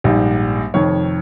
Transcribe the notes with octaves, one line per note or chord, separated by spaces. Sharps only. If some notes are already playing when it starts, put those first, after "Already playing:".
A#1 G#2 G3
F1 F2 D#3 C#5